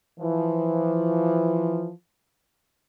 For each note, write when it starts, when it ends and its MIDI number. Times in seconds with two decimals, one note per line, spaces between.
0.19 1.90 52
0.19 1.90 53